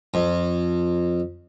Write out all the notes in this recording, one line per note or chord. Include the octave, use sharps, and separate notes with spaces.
F2